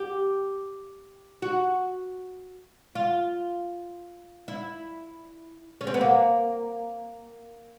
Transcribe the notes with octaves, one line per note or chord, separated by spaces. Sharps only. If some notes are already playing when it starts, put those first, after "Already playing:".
Already playing: G4
F#4
F4
E4
C#4
C4
B3
A#3